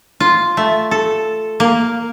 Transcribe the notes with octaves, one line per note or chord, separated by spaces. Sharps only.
F4
A3
A4
A#3